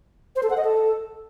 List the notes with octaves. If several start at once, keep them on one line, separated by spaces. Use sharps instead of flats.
C5
A4
F#5
D#5
A4